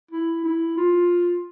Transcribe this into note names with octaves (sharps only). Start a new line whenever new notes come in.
E4
E4
F4